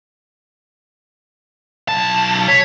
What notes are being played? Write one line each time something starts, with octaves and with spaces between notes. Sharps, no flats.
B1 A5
C#5 B6